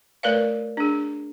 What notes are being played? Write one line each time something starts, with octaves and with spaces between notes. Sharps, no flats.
A3 A#4 B4 C#5 D5 F5
D4 G#4